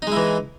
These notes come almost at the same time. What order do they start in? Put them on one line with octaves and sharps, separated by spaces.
D#4 G#3 E4 E3